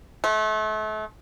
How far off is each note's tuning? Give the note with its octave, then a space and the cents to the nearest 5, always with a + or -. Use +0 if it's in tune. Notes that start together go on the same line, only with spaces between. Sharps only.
A3 -35